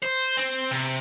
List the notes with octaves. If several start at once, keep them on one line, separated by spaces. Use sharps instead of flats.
C5
C4
C3